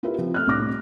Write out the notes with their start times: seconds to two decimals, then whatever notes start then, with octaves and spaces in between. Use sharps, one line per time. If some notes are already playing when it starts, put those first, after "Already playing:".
0.03 E4 F4 G4 A#4 B4 E5
0.18 F3 C4
0.34 A3 F6 F#6
0.47 C2 A2 D4 D6 A#6